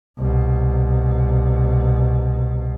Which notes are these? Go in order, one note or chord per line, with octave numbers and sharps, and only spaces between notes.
C2 B2